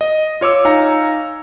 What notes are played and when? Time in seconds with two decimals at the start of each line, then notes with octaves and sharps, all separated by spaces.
0.01 D#5
0.41 F4 C#5 D6 E6
0.65 D#4 C#5 F5 G#5 A#5